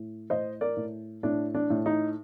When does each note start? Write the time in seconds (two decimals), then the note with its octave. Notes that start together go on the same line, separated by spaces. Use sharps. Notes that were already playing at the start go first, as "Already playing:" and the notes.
Already playing: A2
0.30 A2 C5 D#5
0.61 A#4 D5
0.77 A2
1.23 A2 D4
1.55 D4
1.70 A2
1.86 D#4